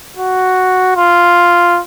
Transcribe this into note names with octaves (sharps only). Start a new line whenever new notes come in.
F#4
F4